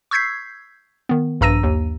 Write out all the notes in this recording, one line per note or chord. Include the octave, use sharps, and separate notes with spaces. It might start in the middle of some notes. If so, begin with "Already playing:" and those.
C#6 E6 G6 G#6 B6 C7
D#3 B3
A#1 G2 A#5 E6 A#6 D#7
D#2